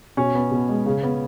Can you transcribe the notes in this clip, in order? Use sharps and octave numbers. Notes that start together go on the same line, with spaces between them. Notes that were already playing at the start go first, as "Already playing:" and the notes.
B2 C#4
B3
B2
G#3
C#3
B3